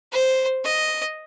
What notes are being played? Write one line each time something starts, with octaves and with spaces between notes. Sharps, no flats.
C5
D#5